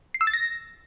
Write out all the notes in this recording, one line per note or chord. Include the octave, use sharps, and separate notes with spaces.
C7
E6
A6
A#6